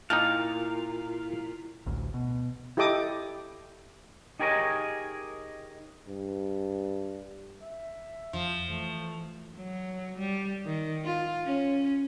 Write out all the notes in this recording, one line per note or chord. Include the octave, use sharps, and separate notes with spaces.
A#2 D#4 E4 F5 G5 A5
A1 D2
B2
E4 G4 A4 D#5 D6 D#6
D#4 G4 G#4 A#4 C#5 D#5
G2
E5
F2 F3
E3 A3
F#3
G3
D#3
F4
C#4